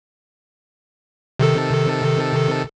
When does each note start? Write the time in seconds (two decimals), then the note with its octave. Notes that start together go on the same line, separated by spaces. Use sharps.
1.39 C3 D#3 A4